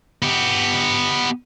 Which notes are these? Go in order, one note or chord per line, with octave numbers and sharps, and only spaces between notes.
B3 G4